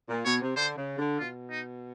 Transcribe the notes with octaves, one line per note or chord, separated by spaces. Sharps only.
A#2
B2 C#5
C3
D3 C5
C#3
D3
B2 F4
D#4